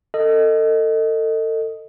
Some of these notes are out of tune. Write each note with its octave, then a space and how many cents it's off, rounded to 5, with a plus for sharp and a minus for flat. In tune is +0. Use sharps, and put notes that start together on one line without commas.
A4 +35 D#5 +0